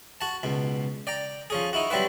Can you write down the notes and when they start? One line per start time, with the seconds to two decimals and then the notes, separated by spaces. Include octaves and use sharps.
0.21 F#4 A5
0.43 C#2 B2
1.07 D5 G5 A#5
1.50 F3 C#4 G#4
1.73 D#4 E4 F#4
1.91 F#3 G3 C4 E4 B4